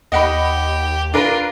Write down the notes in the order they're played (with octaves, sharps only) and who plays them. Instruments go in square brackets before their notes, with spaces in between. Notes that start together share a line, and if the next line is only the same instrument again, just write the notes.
[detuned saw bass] D#2 [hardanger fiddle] G4 [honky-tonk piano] D#5 F#5 B5
[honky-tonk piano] D4 A#4 B4 [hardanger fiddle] F4